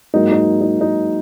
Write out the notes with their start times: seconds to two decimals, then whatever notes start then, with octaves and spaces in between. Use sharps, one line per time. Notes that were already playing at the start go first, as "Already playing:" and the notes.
0.14 G#2 F#3 A#3 D#4
0.32 D#4
0.61 D#4
0.81 D#4